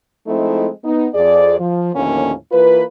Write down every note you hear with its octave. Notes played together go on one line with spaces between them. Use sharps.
F3 G#3 A3 C4 D#4 E4
B3 D#4
F2 G#4 D5
F3
D#2 A2 D3 F3 A#3 C#4
E3 A#3 F4 B4